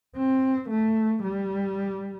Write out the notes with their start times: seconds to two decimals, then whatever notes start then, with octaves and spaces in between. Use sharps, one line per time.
0.16 C4
0.70 A3
1.23 G3